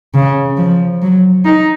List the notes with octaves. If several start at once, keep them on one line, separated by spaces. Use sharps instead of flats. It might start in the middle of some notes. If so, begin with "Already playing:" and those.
C#3
F3
F#3
D#4